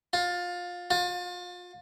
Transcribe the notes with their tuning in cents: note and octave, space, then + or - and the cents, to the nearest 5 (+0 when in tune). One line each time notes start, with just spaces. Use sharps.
F4 +20
F4 +35